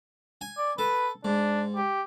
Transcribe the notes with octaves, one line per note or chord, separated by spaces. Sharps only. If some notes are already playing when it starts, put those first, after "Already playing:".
G#5
D5
A4 B4
G#2 D4
G4